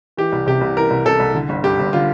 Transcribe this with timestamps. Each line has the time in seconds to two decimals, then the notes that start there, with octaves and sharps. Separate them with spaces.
0.17 E3 G4
0.32 C2
0.47 C3 G4
0.61 C2
0.76 E3 A#4
0.91 C2
1.05 C3 A4
1.20 C2
1.34 D3
1.49 G1
1.63 G2 G4
1.79 G1
1.93 D3 F4